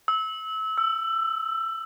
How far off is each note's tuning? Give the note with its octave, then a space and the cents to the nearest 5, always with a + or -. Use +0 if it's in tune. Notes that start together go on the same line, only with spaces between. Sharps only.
E6 -25
E6 +20